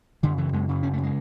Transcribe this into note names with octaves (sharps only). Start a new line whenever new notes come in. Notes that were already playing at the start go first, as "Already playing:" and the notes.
F#2 D3
C#3 E3
F#2 G#3
C#3
F#2 C#4
A3
C#3
G#3